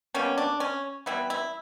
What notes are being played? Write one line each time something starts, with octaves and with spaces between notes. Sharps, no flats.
B2 G3 A#3 C#4
D4
C#4
E3 G3 B3 E4
E4